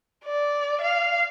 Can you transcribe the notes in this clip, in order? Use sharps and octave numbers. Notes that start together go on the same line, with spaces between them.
D5
F5